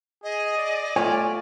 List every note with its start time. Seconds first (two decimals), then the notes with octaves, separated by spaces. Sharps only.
0.24 G#4 D#5
0.57 D5
0.96 A3 F4 C#5 G#5